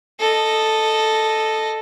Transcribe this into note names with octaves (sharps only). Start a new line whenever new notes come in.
A4 D#5